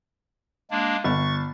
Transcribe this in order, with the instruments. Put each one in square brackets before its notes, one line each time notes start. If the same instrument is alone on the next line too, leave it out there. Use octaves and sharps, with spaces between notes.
[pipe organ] G#3 A#3 D4
[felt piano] G1 [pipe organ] C#6 A6